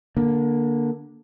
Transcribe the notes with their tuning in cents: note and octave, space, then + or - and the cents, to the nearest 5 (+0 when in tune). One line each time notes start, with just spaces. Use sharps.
D3 +0 A#3 +15